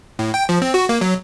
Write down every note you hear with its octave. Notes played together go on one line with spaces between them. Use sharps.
A2
G5
F3
C4
F#4
A#3
F#3